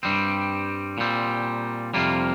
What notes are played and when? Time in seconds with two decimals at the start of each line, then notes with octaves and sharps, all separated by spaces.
0.03 G2 G3 C4
0.98 A#2 G3 C4
1.94 F2 C3 G3 A#3 F4